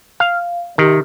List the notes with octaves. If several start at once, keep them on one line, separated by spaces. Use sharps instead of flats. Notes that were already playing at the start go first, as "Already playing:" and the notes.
F5
C3 D#3